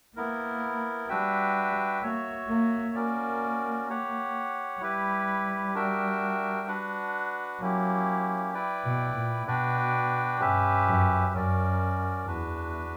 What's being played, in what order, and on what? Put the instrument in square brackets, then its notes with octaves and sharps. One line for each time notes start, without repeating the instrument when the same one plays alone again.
[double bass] A#3 [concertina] B3 E4 A#4
[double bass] G3 [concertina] D4 F#4 B4 E5 G5
[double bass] A#3 [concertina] F#4 C#5 E5
[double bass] A#3
[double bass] A#3 [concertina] C#4 F#4 A#4 D5
[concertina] G4 C#5 F#5
[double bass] G3 [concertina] E4 G4 B4
[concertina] D4 F#4 A#4 E5 G5
D4 F#4 B4 F#5
[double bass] F#3 [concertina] A#3 C#4 E4 G4
[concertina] E4 B4 D5 G5
[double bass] B2
A#2
[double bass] B2 [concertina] D4 F#4 B4 D5 G5
[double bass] G2 [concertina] C#4 G4 B4 E5
[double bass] F#2
[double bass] F#2 [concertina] C#4 F#4 A#4 D5
[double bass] E2 [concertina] D4 F#4 B4